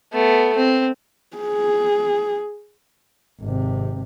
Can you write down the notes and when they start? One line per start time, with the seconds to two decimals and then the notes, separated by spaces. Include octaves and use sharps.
0.13 A3 B3
0.56 C4
1.37 G#4
3.40 G#1 C3